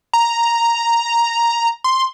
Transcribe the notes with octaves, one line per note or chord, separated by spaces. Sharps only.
A#5
C6